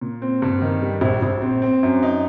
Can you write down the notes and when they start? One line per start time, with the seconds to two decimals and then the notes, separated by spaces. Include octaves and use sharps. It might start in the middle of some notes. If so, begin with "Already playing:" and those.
0.01 A#2
0.22 C4
0.42 G2
0.62 D#3
0.82 G3
1.01 A#1
1.22 A#1
1.42 C4
1.62 C4
1.83 F#2
2.03 D#4